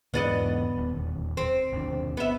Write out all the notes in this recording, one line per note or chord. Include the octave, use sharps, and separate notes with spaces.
E2 G#2 D3 B3 D5 D#5
E1 D#2
C4
G1 D#2 D4
B3 E5